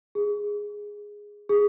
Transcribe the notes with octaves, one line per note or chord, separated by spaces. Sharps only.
G#4
G#4